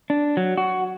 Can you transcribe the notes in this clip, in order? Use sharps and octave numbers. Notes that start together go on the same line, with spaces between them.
D4
F#3
F#4